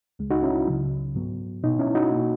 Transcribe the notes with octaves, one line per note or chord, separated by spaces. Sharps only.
C#2 C#3 G#3
D#4 F#4
C#4 E4
C#2 C#3 F#3
G#2 F#3 B3
B2 F#3 B3 D#4
C#4 E4
D#4 F#4
B2 A#3